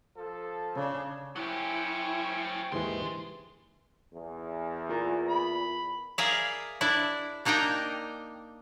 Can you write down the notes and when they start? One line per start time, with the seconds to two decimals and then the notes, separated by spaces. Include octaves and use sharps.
0.16 F3 A4
0.75 C#3 D4
1.36 F#3 C#4 E4 G4 C5 C#6
2.72 D#2 G#2 E3 D#4 C6
4.13 E2
4.89 F4 A#4 A#5
5.29 B5
6.18 G#4 A#4 D5 E5 F5
6.81 D4 E4 D5
7.45 A#3 D4 D#4 A#4 G5